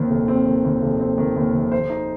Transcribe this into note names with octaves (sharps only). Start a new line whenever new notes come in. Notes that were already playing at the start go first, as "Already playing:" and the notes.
Already playing: D#2 D#3 C4
F1
C4
D#3
D#2
F1
C4
D#3
D#2
F1
C5
D#4